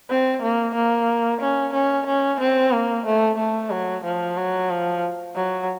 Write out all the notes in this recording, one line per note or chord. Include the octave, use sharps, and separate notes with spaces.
C4
A#3
A#3
C#4
C#4
C#4
C4
A#3
A3
A3
F#3
F3
F#3
F3
F#3